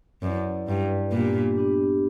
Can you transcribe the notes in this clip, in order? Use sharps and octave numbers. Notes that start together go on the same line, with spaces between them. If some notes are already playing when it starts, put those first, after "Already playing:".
F#2 E4 B4 D5
G2 E4 B4 D5
A#2 B3 D4 G4
B3 D4 G4